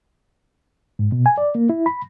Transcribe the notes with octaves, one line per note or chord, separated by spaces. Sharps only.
G#2
B2
G#5
D5
A#3
E4
B5